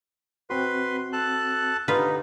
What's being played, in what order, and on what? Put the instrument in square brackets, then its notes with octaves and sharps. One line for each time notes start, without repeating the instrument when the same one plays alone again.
[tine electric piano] C4 F#4 [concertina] B4 C6
[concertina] A4 A5 F#6
[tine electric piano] D3 G4 [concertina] D#4 [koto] F4 B4